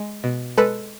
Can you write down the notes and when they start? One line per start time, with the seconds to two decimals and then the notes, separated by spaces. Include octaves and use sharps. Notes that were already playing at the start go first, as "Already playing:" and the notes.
Already playing: G#3
0.24 B2
0.58 G#3 A4 B4